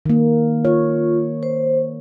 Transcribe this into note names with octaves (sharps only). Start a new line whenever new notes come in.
D#3 A#3
F4 C#5
C5